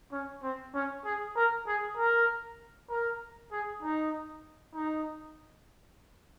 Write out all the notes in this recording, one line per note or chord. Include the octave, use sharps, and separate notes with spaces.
C#4
C4
C#4
G#4
A#4
G#4
A#4
A#4
G#4
D#4
D#4